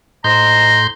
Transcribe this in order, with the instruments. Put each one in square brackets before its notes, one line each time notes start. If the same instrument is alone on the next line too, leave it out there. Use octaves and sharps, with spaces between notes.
[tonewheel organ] A2 C6 G6 [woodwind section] C5 D#5 A#5